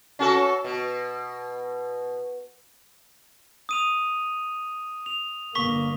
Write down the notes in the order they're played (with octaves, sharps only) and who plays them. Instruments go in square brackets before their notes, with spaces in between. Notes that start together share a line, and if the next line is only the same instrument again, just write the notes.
[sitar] C#4 F#4 A4
B2
[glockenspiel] D#6 D#7 F7
F7
[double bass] G1 A#3 [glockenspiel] C#6 B6 G7